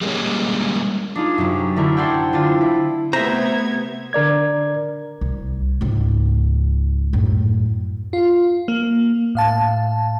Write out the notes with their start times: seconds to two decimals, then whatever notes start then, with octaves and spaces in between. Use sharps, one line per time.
0.01 G3 G#3 A#3 C#4
1.15 D4 D#4 F4 G#4
1.38 F#2 C3
1.76 D3 A3 D4 E4 A#4
1.96 A4 C5 D5 F#5 G5 G#6
2.33 D3 D4 F4 A6
2.61 E4
3.13 C3 A3 B3 C5 E5 A#5 G#6
4.13 D3 A#4 D5 G#6
5.21 C2
5.81 C#2 G#2
7.13 F#2 A2
8.13 F4
8.68 A#3
9.35 A2 F5 A5